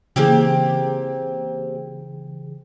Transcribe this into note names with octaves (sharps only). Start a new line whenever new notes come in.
C#3 E3 A#3 C4 G4 G#4